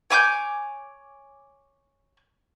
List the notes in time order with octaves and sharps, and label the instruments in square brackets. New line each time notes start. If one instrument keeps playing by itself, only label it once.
[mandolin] C#5 G#5 D6 G6